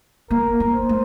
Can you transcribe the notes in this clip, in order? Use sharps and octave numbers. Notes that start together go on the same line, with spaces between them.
A#3 A#4
A#3
C5
A3